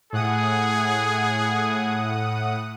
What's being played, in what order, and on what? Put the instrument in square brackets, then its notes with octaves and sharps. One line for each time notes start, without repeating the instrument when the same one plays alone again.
[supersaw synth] A2 F#5 D#6 [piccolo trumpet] G#4